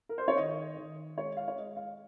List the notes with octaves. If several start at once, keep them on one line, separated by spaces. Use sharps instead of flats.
A#4
C5
C#5
D#3 D#5
D#3
G#3 C#5
F5
C#5
G#3 D#5
F5